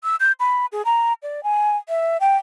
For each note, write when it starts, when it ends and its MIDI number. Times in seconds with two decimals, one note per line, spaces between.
0.04 0.16 88
0.20 0.32 91
0.40 0.66 83
0.72 0.82 68
0.85 1.13 82
1.23 1.43 74
1.43 1.76 80
1.89 2.17 76
2.20 2.37 79